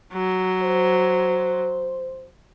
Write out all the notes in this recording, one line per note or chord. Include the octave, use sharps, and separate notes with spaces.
F#3
C5